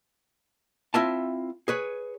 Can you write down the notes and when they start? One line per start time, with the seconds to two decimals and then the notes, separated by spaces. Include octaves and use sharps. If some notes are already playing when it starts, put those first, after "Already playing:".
0.94 C4 E4 F4 E5 A5
1.68 G#4 B4 C#5